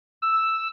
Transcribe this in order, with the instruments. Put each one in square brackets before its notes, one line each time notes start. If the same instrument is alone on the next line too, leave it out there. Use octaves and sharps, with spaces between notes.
[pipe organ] E6